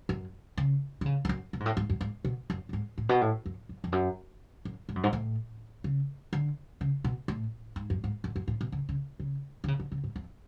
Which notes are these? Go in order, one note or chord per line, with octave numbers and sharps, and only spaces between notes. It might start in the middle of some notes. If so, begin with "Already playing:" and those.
F#2
C#3
D3
C#3
F2
F#2
B2
G#2
A2
G#2
F#2
G#2
B2
F#2
A2
G#2
A2
B2
A2
F#2
F#2
F2
F#2
F#2
G#2
F#2
G#2
A2
C#3
D3
C#3
B2
A2
G#2
F#2
G#2
F#2
F#2
A2
B2
C#3
C#3
C#3
D3
C#3
D3
C#3
G#2
F2